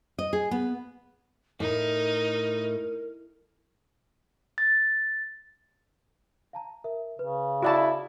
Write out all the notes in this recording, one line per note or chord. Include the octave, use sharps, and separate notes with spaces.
D#5
G#4
B3
A2 D#4 A#4
A6
F5 A5 A#5
A#4 E5
C#3 B4
E4 F#4 D5 A5